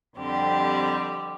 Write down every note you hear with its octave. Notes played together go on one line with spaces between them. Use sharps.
F2 D3 G3 C4 G4